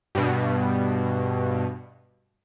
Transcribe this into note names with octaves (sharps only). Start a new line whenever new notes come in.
G2 B2